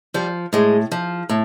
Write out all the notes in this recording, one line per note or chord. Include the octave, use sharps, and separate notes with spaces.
F3 G3
A2 G#3
F3
A2